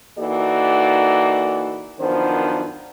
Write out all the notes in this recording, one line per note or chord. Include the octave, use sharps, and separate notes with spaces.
E3 A#3 D#4 F#4 A4 D5
F#2 D#3 F3 B3 D4 C5